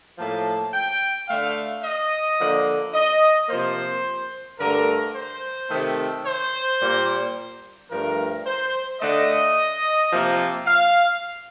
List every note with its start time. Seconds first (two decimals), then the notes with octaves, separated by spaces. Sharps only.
0.18 A2 F3 A#3 A5
0.73 G5
1.28 D3 A3 F5
1.83 D#5
2.39 D3 F3 A#3
2.94 D#5
3.49 C3 F3 A#3 C5
4.59 G2 D3 A3 A#4
5.14 C5
5.70 C3 D#3 A3
6.26 C5
6.80 A#2 G3 A#3
7.90 G2 F3 A3 A#4
8.46 C5
9.01 D3 A3 D#5
10.11 C3 F3 A#3
10.66 F5